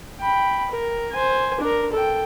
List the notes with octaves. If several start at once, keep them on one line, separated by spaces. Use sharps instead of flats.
G5 B5
A#4
C5 G#5
D4 A#4
A4 G5